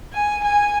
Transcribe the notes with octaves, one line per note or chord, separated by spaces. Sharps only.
G#5
G#5